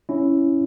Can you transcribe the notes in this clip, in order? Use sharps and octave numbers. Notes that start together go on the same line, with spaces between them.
C#4 E4